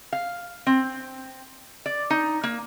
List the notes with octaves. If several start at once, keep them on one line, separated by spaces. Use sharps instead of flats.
F5
C4
D5
D#4
A#3